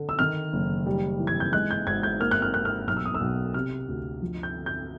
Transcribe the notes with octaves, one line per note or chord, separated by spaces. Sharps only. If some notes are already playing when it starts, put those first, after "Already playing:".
Already playing: D3
E6
D#3 F6
F#1
G3
E3
G#6
G6
G#3 F#6
G6
G#1 G#6
G6
A#3 F6
F#6
F6
A#3 F#6
F6
B1 F6
E6
D#6
E6
B1
C3 F6
D2
F3
G6
D3
G6